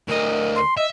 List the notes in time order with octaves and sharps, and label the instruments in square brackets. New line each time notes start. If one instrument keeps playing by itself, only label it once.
[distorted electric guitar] D2 D#5 [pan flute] A#4
[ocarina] C6
[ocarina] D#5 [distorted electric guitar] E5